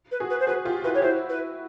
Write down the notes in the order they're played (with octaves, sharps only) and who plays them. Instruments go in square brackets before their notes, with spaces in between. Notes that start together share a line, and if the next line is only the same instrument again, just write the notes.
[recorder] B4
[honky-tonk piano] F#4 G#4
[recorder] B4
C5
[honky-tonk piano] F#4 G#4 [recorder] B4
[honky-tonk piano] F4 G4
[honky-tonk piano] E4 F#4 [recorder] B4
[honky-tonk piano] G4 [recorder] C#5
[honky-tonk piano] E4 F#4 [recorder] C5
[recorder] B4